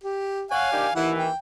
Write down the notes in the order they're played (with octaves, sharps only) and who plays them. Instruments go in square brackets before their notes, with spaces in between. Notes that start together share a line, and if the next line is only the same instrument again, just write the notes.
[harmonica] G4
[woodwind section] C#5 F#5 [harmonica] F5 G#5
[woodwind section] D#3 D4 G4
[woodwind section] D#2 E3 [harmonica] E4 F#5
[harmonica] G5